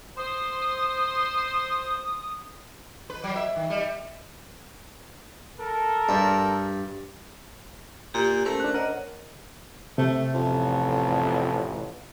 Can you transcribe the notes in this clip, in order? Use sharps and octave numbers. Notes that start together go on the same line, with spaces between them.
C5 D#6
B4
F#3
E5
D#3
G3
A4 A#4
G2
A#2 G4
A3 C#4 A#4 C5
D4 F#6
A#4 C#5 D#5 F#5
C3 A3
A1 F2